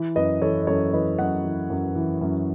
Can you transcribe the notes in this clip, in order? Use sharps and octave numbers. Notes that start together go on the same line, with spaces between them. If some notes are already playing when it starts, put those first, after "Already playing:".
Already playing: E3
F#2 B4 D#5
E3 A4 C#5
D#5
F#2 A4 C#5
E3 B4 D#5
F#2 D#5 F#5
E3
F#2
E3
F#2